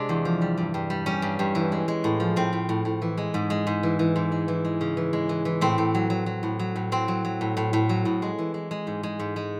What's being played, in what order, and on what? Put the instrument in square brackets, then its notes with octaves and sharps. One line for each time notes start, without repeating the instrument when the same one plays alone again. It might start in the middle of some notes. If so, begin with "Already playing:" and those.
Already playing: [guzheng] C3 G#3 D4
E2
F3
G3
G2
G2
G3
G3 C#4
G2
G2
E3
G#3
G#3
A2
F3
A2 C4
A2
A2
A2
E3
G#3
G#2
G#3
G#2
E3
E3
G#2
G#3
E3
G#3
C#3
E3
G#3
E3
E3
A2 C4
A2
F#3
F#3
F#3
A2
F#3
A2
F#3 C4
F#3
F#3
A2
A2
A2
F#3
A2
G#3
E3
G#3
G#3
G#2
G#3
G#2
G#3